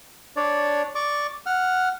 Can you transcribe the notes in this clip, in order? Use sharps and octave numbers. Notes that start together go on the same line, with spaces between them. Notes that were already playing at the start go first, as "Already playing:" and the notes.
D4 C#5 D5
D5 C#6 D6
F#5 F6